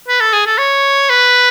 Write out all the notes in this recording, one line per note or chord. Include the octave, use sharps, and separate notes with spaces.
B4
A4
G#4
A4
C#5
B4